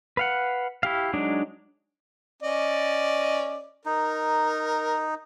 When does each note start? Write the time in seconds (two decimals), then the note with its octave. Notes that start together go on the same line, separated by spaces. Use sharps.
0.17 B4 F5 F#5
0.83 E4 G4 F5
1.13 F#3 G#3 D4 D#4
2.43 C#4 D5 D#5
3.86 D#4 A#4